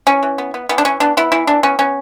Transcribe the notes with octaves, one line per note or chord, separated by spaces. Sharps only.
E3 C#4
E3
B3
B3
E3 B3
D4
E3 C#4
B3 D4
B3 E4
E3 E4
E3 D4
B3 C#4
B3 C#4